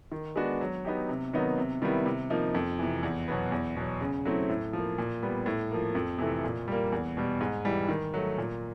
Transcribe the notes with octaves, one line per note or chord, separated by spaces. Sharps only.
D#3
G#3 B3 D4 F#4
F#3
B3 D#4 G4
C3
D#3 F#3 B3 D#4
C3
D#3 G3 B3 E4
C3
F3 A#3 D#4
F2
C3 E3
E2
B2 F#3 B3
E2
B2 F#3
C#3
F#3 A3 C4 E4
A2
F3 A#3
A#2
G3 B3
A2
F3 A#3
F2
C3 E3 A3
A#2
G3 A#3
E2
B2 G3
G#2
E3 G3
D#3
F#3 A3
A#2